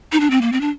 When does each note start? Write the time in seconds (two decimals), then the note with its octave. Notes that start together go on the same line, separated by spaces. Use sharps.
0.12 D#4
0.20 D4
0.31 C4
0.42 A#3
0.52 C4
0.61 D4